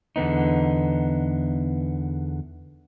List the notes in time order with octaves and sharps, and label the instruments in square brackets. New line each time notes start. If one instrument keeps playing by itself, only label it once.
[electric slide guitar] E2 D3 B3 D#4